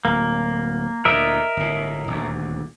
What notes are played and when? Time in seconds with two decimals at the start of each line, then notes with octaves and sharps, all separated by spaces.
0.05 D1 A#3
1.05 D2 A#2 A#4 D#5 E5
1.57 G1 A2
2.07 D#1 D2